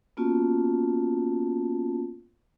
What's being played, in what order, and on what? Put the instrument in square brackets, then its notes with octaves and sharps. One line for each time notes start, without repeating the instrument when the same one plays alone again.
[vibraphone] A#3 B3 C#4 F4 F#4 A5